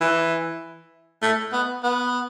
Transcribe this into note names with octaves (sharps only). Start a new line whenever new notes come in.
E3
A3
B3
B3